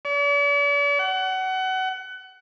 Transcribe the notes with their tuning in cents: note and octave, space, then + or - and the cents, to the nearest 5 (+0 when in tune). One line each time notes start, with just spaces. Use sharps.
D5 -45
F#5 +25